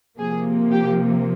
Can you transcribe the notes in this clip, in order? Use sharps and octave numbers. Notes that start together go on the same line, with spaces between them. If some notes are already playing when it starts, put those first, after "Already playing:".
C3 F3 A#3 G#4
G4